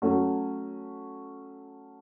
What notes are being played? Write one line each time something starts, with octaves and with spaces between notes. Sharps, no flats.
F#3 A3 C#4 F#4